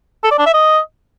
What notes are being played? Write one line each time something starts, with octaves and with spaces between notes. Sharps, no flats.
A4
D5
D4
E5
D#5